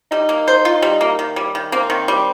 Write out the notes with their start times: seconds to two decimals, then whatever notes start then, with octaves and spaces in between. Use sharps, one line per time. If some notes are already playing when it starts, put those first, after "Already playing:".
0.12 G3 D#4
0.29 A#3
0.48 C5
0.65 F4
0.82 G3
1.01 A#3
1.19 D#3
1.36 G3
1.55 D#3
1.72 A#3 C4
1.90 D#3
2.08 G3